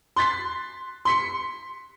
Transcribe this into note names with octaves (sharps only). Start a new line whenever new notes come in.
C6 F#6 A6 B6 C7
C6 B6 C#7